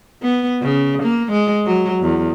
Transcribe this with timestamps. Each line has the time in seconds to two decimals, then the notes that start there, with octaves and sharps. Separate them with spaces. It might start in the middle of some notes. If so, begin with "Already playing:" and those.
0.22 B3
0.62 C#3
1.03 A#3
1.32 G#3
1.66 F#3
2.02 E2